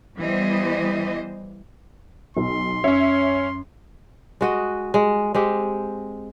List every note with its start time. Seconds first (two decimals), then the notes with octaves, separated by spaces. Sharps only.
0.18 E3 G3 B3 C5 D#5
2.37 B1 C6
2.84 F#2 C#4 C#5 E5
4.41 G#3 F#4 D#5
4.94 G#3
5.34 G#3 C4 G4